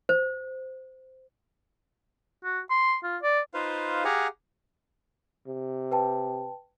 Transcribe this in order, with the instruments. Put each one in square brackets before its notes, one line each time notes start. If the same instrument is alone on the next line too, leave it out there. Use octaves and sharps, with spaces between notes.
[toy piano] C5
[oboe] F#4
C6
F4
D5
[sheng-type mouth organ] D#4 F4 B4 C5 F5
G4 G#4 F5 F#5 G#5 A#5
[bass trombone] C3
[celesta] B4 G5 A5